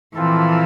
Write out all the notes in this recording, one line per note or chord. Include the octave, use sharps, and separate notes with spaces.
A#2 E3 F3 C4 F4 A4